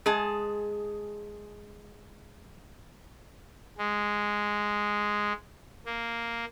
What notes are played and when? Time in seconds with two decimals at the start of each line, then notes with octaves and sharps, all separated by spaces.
0.06 G#3 G#4 A5
3.78 G#3
5.86 A#3